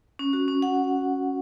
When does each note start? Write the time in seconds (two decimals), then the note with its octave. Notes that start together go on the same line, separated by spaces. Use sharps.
0.19 C#4
0.33 F#4
0.48 C#4
0.62 F#5